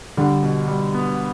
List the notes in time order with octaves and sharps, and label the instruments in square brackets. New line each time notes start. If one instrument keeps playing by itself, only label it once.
[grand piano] D3 [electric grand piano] G3
[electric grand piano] B2
G3
B3